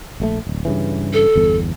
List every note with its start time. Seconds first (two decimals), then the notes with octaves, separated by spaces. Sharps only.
0.20 A#1 G#3 A3
0.47 D1
0.65 G2 C#3 E3
1.13 A4
1.36 G1 E2